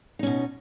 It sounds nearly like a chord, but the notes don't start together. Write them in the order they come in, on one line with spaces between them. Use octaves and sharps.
D#4 C#4 B2